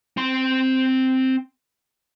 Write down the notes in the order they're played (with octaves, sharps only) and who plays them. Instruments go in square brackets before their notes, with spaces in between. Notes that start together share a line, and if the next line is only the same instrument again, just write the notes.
[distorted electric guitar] C4 C6